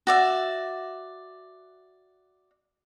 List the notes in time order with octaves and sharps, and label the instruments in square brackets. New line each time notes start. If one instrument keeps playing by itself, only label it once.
[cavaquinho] F#4 D5 E5